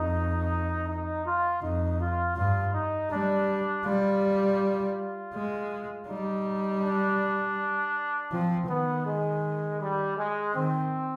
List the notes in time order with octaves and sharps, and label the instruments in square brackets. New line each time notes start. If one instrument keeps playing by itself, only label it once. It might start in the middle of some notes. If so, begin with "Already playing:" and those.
Already playing: [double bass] F2 [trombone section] D#4
[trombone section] D#4
F4
[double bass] F2 [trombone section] D#4
[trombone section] F4
[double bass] G2 [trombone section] F4
[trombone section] D#4
[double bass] G3 [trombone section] D4
[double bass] G3 [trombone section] F4
[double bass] G#3
[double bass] G3 [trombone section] D#4
[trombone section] D4
[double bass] F3 [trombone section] C4
[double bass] D#3 [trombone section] B3
[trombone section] G#3
G3
G#3
[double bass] D#3 [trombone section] C4